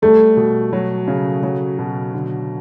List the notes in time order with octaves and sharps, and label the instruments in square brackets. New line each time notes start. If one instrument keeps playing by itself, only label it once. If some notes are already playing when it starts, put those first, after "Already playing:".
[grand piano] G3 [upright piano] A3
[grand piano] B2
F#3
C#3
F#3
B2
D3